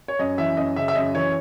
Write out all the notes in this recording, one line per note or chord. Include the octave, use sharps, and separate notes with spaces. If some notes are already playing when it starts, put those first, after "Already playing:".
C#5
F#2 D#5
E3 E5
F#2 D#5
C#3 E5
E5
F#2 D#5
E3 C#5